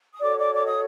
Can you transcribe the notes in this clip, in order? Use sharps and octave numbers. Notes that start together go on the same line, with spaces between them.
D#6
F#4 A4 C#5 D5 D6
D5 D6
D5 D6
D#5 D#6